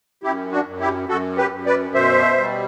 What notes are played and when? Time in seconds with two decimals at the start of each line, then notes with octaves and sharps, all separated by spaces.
0.23 F#2 E4 G4
0.52 D4 F#4
0.66 F#2
0.80 E4 G4
1.09 F#2 F#4 A4
1.37 G4 B4
1.52 F#2
1.66 B4 D5
1.94 B2 C5 E5
2.38 G3